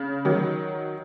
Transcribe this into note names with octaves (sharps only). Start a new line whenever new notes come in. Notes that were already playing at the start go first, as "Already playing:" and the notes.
Already playing: C#3
D#3 F#3